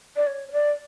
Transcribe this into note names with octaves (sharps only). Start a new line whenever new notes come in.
D5
C#5
C#5
D5